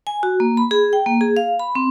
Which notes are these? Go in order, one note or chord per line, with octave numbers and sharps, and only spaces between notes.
G#5
F#4
A#3
B5
G#4
G5
A#3
G#4
F5
B5
C4